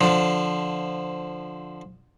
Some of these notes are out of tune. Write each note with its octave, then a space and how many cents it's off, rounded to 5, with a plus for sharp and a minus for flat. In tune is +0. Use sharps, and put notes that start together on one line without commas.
D3 +0 F3 +0